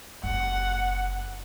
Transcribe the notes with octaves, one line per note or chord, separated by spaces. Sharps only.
F#1 F#5